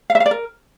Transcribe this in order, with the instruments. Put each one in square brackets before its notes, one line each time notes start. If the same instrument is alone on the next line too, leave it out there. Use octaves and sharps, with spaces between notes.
[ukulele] F5
E5
F5
D5
A#4